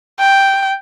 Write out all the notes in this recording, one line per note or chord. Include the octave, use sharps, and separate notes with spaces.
G5